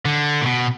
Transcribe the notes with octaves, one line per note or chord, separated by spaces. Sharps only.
D3
A#2
B2